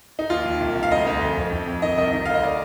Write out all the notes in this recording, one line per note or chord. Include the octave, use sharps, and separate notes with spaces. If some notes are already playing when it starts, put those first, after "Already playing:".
D#4
D#2 F4
D#2
C2
C2
F5
D2 D#5
D2
F2
F2
F2
F2
D#3 D#5
C2 D#5
D#3
D2 F5
D#5
D5